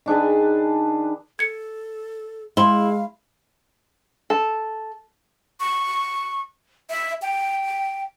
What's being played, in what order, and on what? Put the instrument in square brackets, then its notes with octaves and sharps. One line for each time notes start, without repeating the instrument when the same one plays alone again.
[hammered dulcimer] D#3 D4 G#4 B4
[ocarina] A4 [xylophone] G#6 C#7
[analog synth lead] G#3 [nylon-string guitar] E4 [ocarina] F5 [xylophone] C6 G7
[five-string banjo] A4
[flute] C#6
E5
G5